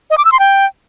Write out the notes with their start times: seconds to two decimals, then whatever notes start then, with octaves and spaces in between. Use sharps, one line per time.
0.10 D#5
0.18 D6
0.25 E6
0.32 C6
0.39 G5